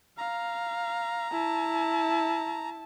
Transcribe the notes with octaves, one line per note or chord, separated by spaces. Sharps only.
F5 A#5
E4 A5